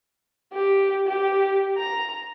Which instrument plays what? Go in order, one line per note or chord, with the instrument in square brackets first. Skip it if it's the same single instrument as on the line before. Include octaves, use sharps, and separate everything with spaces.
[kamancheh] G4
G4
A#5